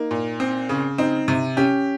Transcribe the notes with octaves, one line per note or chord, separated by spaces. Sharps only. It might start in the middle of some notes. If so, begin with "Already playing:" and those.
Already playing: A#3 D#4
A#2
C4
C#3
C4 D#4
C3
C#4 G4